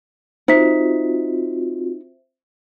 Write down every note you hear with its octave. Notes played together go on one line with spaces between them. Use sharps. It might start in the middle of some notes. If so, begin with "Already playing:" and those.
C4 D#4 F4 F#4 C5 E5 B6